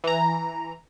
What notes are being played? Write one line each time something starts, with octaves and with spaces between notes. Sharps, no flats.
E3 A#5